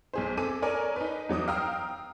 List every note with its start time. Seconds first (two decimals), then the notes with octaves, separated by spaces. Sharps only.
0.14 B1 G#4 C5
0.37 C4 A4 G#5 D6 D#7
0.62 A4 A#4 C#5 D5 G#5
0.96 D#4 B4
1.29 E2 F#3 D6 D#6
1.48 F5 G5 A#5 D#6 E6